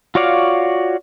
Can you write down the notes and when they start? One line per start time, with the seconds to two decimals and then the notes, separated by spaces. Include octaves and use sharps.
0.15 F4 F#4 C#5 D5 F5